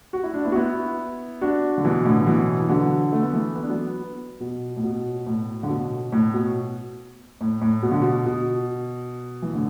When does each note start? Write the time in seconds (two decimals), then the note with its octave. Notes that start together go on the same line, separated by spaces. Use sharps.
0.13 F#4
0.24 E4
0.34 D4
0.45 B3 E4
0.52 F#4
0.55 B3 E4
1.41 D4 F#4
1.78 D3
1.84 B2 E3
2.05 A2 D3
2.27 B2 E3
2.60 E3
2.69 D3 F#3
3.12 A3
3.23 B3
3.33 E3 A3
3.55 B3
3.63 D4
3.69 F#3 B3
4.40 B2
4.77 A2
4.84 B2
5.26 A2
5.63 D3
5.69 B2
6.12 A2
6.34 B2
7.41 A2
7.61 A2
7.83 B2
7.91 D3
8.01 B2
8.26 B2
9.42 E3
9.53 A2 D3